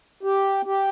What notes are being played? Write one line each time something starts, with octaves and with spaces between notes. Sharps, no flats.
G4
G4